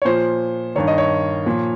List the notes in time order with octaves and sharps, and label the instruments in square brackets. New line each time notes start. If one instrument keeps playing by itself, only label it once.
[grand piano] C#5
A#2 F3 C5
G2 D#3 C#5
D#5
C#5
A#2 F3